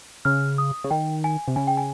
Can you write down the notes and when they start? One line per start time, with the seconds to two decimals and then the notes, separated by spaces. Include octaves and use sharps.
0.25 C#3 F6
0.58 D#6
0.84 C#3
0.91 D#3 G5
1.24 G#5
1.48 C3
1.56 C#3 G#5
1.67 G5
1.77 G#5